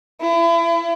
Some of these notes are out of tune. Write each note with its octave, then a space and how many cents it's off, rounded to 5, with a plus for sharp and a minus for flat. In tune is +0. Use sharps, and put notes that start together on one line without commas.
E4 +35